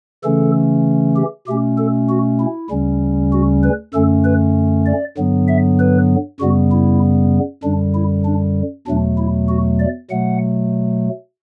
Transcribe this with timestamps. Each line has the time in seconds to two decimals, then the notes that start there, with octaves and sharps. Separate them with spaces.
0.24 C#3 E3 A3 C#4 A4
1.16 G4
1.47 B2 A3 C#4 G4
1.78 A4
2.09 F#4
2.40 E4
2.70 D2 C#3 G3 C#4
3.32 F#4
3.63 B4
3.94 F#2 D3 A3 C#4 A4
4.24 B4
4.86 D5
5.17 G2 D3 F#3 B3
5.48 E5
5.79 B4
6.40 F#2 C#3 G3 B3 F#4
6.72 E4
7.64 F#2 D3 G3 D4
7.95 E4
8.25 D4
8.87 E2 B2 F#3 A3 D4
9.18 E4
9.48 F#4
9.79 D5
10.10 B2 F#3 A3 F#5